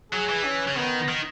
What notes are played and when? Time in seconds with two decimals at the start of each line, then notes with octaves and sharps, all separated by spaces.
0.12 F#3 G#4
0.29 E3
0.44 C#4
0.68 C#3
0.76 D#3 B3
1.09 D#3